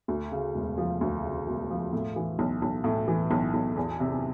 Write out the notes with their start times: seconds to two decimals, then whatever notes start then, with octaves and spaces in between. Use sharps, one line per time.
0.08 D2
0.32 C#3
0.55 E1
0.78 F3
1.01 D2
1.23 C#3
1.47 E1
1.70 F3
1.93 A2
2.16 E3
2.39 B1
2.62 B1
2.84 A2
3.08 E3
3.31 B1
3.54 B1
3.76 E2
4.00 C3